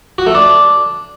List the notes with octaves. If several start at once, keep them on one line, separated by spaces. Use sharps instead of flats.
F#4
A3
D4